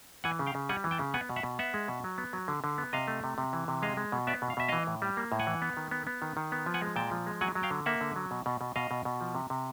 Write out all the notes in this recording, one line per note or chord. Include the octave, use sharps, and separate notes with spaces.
E3 F#5 G#5
C#3
F5 G5
C#3
G3 F#5 G#5
E3
G5 A5
C#3
B3 F#5 G#5
B2
E5 F#5
B2
B3 E5 F#5
G#3
B2
F#3
B3
F#3
D3
D3
B3
C3 D#5 F5
A3
C3
C3
E3
C3
G#3 D#5 F5
G#3
B2
B3 D5 E5
B2
F5
B2 E5
E3 D#5 F5
A2
G3
A#3
A2
F#5 G#5
E3
B3
D#3
B3
B3
D#3
D#3
B3
F3
F#5 G#5
G#3
A#2 G5 A5
F3
G#3
F#3 F#5 G#5
F#3
F5 G5
D3
A#3 E5 F#5
D3
F#3
B2
B2
B2
B2 D#5 F5
B2
B2
F3
C3
C3